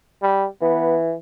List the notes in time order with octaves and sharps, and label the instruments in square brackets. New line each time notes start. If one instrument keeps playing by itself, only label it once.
[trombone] G3
[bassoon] E3 [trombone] B3